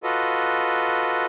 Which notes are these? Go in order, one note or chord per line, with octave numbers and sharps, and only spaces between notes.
F4 F#4 A4 B4 D#5